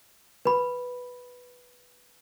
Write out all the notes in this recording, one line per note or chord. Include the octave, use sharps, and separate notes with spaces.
B4 B5